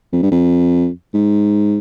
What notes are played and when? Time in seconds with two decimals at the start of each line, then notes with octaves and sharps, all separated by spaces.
0.13 F2
0.23 G2
0.31 F2
1.14 G#2